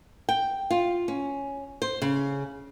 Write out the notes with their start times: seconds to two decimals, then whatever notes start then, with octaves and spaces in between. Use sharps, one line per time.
0.29 G5
0.71 F4
1.08 C#4
1.82 C5
2.02 C#3